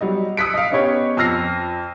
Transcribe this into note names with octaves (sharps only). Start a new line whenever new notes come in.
F#3 G3 D#5
D#6 E6 F#6 B6 C#7 D7
D#5 F5
B3 C#4 D#4 G4 C#5
F2 E6 F6 A#6 C7